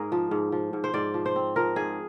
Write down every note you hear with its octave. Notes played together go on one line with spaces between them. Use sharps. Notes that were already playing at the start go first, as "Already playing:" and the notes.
Already playing: G#2 G#4 A#4
F3
G#2
F3
G#2
C5
G#2 D5
F3
C5
C4
F3 A#4
G#2 G#4